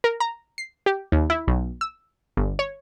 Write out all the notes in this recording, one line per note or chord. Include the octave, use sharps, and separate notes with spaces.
A#4
A#5
C7
G4
D#2
E4
B1
E6
G1
C#5